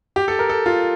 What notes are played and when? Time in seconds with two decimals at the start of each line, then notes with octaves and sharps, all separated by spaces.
0.16 G4
0.28 A4
0.39 A#4
0.50 A4
0.66 F4